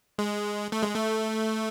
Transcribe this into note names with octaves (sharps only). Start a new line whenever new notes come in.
G#3
A3
G#3
A3